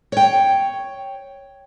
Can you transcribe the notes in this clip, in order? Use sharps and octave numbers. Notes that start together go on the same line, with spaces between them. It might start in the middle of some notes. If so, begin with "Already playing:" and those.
C#5 G5